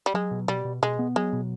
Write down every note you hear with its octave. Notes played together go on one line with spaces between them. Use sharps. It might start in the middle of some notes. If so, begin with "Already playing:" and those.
G3
F#3 G#3
B2
B2 G3
B2
B2 G#3
B3
F#3 G#3
B2